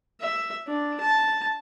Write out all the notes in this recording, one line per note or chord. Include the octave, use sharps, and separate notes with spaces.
E5
D4
A5